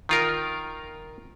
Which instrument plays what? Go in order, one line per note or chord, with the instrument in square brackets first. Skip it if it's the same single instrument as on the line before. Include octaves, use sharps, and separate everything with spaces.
[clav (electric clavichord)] D#3 F4 A#4